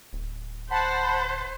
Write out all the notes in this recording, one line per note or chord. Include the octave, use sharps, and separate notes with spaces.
D1
C5 F#5 A5 B5